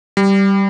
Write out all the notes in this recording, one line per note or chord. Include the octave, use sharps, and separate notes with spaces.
G3